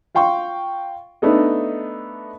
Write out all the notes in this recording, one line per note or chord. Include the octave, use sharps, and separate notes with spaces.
F4 F5 G5 C6 C#6
A3 B3 D4 D#4 A4 D#5